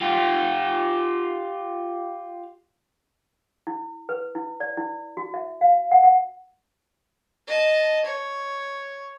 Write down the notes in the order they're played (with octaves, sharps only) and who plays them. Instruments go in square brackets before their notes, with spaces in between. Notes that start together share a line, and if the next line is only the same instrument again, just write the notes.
[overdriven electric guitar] F4 G4
[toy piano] E4
B4
E4
D5
E4
F#4
E5
F5
F#5
F#5
[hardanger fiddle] D#5 A5
C#5